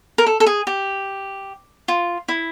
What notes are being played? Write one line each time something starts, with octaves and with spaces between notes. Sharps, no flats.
A#4
A4
A4
G#4
G4
F4
E4